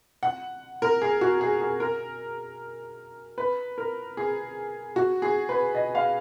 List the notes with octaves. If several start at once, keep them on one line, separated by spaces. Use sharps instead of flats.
F#5
A#4
G#4
F#4
G#4
G#4
A#4
B4
A#4
G#4
F#4
G#4
B4
D#5
F5